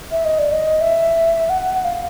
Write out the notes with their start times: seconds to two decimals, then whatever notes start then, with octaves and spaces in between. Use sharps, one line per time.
0.12 E5
0.25 D#5
0.39 D5
0.52 D#5
0.81 E5
1.50 F#5
1.85 F5